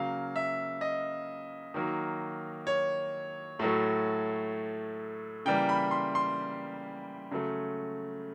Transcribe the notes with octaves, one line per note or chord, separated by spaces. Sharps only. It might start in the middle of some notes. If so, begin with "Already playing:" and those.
Already playing: C#3 F#3 A#3 F5
E5
D#5
D#3 F#3 A#3
C#5
A2 F#3 A3
C#3 E3 G3 A#3 G5
B5
C6
C6
C#3 F#3 A3